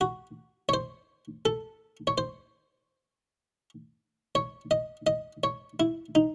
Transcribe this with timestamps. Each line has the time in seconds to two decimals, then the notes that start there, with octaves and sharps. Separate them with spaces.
0.01 F#4
0.69 C#5
0.74 C5
1.45 A4
2.07 C#5
2.18 C5
4.35 C#5
4.71 D#5
5.07 D#5
5.44 C#5
5.80 E4
6.15 D#4